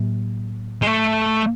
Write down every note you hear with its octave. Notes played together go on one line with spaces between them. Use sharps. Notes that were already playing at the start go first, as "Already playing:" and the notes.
Already playing: A2 F#3 A#3
G#3
A3